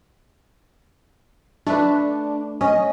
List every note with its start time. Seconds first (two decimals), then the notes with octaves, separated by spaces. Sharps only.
1.67 A3 D4 B4
2.61 C#4 D#5